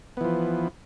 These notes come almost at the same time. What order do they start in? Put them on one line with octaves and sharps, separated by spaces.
B3 E3 F3